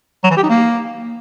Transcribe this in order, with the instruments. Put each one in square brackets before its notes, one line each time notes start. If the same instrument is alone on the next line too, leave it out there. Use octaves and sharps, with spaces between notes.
[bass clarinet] F#3
E3
G4
D#4
A#3